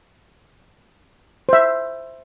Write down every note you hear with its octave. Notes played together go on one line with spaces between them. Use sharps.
C5 E5